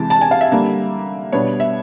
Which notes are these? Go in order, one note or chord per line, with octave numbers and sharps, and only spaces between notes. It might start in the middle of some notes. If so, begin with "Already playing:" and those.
Already playing: C3 E3 G#3 A5
A5
G#5
F5
E5
D3 G3 A#3
B2 G3 B3 D4 C#5
E5